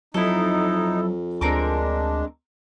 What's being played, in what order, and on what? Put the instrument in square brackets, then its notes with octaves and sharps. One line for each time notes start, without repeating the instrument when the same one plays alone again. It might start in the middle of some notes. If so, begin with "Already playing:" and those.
[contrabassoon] F2 [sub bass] F#3 [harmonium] D#4 [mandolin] E4 A4
[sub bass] D2 [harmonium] G#3 D4 [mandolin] C4 A#4 D6